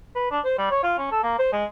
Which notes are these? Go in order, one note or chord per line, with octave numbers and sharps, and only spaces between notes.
B4
D4
C5
G3
C#5
F4
C#4
A4
A#3
C5
G#3